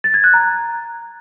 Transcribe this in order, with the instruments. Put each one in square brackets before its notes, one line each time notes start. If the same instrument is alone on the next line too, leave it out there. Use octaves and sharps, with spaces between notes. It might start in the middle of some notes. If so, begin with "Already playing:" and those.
[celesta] A6
G#6
F#6
A#5